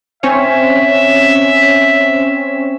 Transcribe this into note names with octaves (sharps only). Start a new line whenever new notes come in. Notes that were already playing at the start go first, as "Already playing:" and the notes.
C4 C#4 C#5 E5